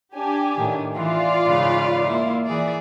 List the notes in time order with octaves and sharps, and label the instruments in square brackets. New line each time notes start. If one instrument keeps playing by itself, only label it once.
[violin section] D4 G4 G#5
[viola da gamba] A2 D#3
[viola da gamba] E3 [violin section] F4 D5 F5
[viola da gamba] G#2 C#3 B4
A#3 E4
E3 G#4 D5